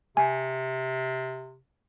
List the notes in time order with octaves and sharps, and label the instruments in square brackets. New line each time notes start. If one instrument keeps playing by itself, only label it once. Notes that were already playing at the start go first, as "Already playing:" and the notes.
[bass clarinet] C3 [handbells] G#5